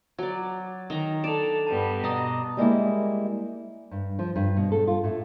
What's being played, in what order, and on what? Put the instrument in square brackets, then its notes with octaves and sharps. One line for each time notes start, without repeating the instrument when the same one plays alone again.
[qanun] F#3 D5 [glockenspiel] G#6
[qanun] D#3 A#5
[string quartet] D4 A4 [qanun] D5 [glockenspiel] E7 F7
[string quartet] G2 G3 B3 [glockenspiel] A5
[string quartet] B2 [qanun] D5 D#5 [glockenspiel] A#5 D#6
[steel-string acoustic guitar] G3 G#3 A#3 E4
[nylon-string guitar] G2
F3
G2
B2
A4
F4
A2